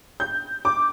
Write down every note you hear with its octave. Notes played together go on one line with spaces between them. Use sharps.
G6
D6